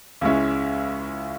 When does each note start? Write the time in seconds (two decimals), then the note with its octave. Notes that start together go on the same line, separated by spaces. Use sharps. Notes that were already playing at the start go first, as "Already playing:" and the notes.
0.21 C#2 C#3 G#3 C#4 E4